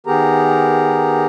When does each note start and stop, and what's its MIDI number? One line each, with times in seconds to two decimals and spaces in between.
0.07 1.27 51
0.07 1.27 59
0.07 1.27 67
0.07 1.27 68
0.07 1.27 70
0.07 1.27 82